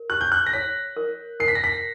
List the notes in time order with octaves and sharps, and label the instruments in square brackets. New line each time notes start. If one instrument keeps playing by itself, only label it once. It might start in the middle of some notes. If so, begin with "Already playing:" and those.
Already playing: [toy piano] A#4
[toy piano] G4 [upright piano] F#6
[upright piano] G6
F#6
A#6
[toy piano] C#5 [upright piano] B6
[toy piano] A#4
[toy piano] A#4 [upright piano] C7
[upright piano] B6
A#6
B6